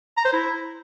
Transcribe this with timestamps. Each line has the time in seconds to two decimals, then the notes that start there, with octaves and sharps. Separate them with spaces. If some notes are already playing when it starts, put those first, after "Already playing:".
0.17 A#5
0.25 C5
0.33 E4